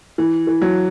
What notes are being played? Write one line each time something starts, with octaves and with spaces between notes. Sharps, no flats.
E3
E3
F#3